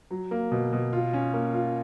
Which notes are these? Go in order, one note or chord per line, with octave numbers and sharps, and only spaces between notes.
F#3
A#3
B2
B2
F4
C#4
A#3
F4